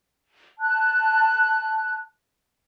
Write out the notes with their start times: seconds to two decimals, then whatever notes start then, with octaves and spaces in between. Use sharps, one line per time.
0.59 A5 F#6